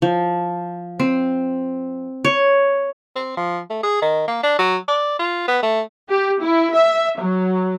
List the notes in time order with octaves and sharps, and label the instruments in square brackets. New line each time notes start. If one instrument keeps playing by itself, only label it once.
[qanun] F3
C4
C#5
[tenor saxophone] C4
F3
A3
G#4
D#3
A#3
D4
F#3
D5
F4
B3
A3
[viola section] G4
E4
E5
F#3